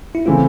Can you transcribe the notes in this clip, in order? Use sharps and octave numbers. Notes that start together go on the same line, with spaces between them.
E4
C#3 E3 A3 C4 F4